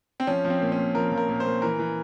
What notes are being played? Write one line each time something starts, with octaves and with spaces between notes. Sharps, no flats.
C4
F3 C#4
F3
C4
A#2
C#4
A#2
F3 A#4
F3
A#4
A#2
C5
A#2
E3 A#4
E3